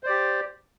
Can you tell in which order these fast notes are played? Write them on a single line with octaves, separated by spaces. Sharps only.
C5 D5 G4